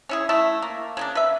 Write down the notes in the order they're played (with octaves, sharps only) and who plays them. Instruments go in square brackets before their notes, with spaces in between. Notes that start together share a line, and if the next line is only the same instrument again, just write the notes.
[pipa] C#4 E4 G#4
A3 E4
A#3
C#3 A#3 D4
B4 E5